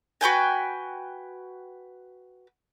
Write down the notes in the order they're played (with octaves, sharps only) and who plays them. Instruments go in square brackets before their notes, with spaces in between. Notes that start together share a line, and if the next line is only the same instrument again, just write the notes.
[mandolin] F#4 B4 G5 G#5